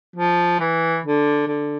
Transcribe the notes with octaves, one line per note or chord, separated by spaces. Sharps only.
F3
E3
D3
D3